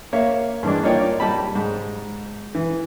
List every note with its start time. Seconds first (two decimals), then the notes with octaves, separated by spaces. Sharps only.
0.13 A#3 C#5 E5 F5
0.63 G2 E3 G#3 D4
0.83 A#3 D#4 F4 C#5 D5 G5
1.20 G3 D#5 A5 B5
1.55 G#2
2.55 E3